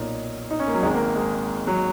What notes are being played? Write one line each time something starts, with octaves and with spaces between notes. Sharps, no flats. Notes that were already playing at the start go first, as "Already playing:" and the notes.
Already playing: B1 A#2 D#4
D#4
C#4
A#3
F#3
G#1 G#2 D#3 G#3
A#3
G#3
F#3